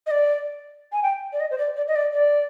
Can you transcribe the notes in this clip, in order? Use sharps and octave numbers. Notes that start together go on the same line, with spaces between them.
D#5
D5
G#5
G5
D5
D#5
C5
D5
D5
D#5
D5
D5